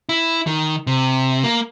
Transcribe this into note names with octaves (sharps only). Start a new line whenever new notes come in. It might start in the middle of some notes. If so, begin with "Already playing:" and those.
E4
D#3
C3
A#3